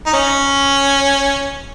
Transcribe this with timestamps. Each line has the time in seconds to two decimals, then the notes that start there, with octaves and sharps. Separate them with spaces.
0.07 D#4
0.13 C#4